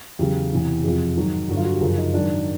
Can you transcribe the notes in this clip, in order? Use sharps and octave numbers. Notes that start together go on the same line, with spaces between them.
E2 C#3 F#3 G4
E2 C3 E3
F2 C3 F3 G#4
G#2 D#3 F#3
G2 D3 F#3 F#4
F4
F#4
G4
F#2 C#3 F3 G#4
D#4
G#2 D#3 F#3 D4